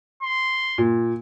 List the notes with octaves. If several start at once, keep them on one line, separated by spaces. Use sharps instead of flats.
C6
A#2